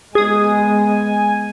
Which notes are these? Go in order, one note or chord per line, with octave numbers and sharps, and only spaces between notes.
G#3 B3 G#4 G#5 D#6